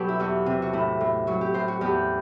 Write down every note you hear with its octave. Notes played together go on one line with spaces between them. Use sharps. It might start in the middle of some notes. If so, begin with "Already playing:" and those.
Already playing: B2 F#3 G4 A4 B4
E4
E2 F#4
C3
F#4
A2 E4
A2
F#3 F#4
G4
A2 C5
F#4
E2 G4